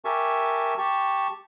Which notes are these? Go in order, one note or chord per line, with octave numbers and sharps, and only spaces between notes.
G4 A#4 E5 G#5 A5 C#6
G4 A5 C#6